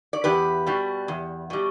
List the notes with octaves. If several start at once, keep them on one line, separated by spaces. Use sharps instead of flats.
D5
E2 G4 B4
B2 G3
E2
B2 G3